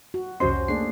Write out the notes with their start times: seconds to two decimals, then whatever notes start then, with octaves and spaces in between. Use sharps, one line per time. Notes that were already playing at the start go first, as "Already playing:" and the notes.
0.14 F#4
0.40 C2 F2 C#4 F#4 C5 D#5 C6
0.68 A3 A#3 D4 G#4 C7